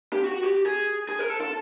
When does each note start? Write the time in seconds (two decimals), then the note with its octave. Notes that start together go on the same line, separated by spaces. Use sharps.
0.13 G4
0.24 F#4
0.44 G4
0.66 G#4
1.09 G#4
1.19 A#4
1.30 A4
1.41 A4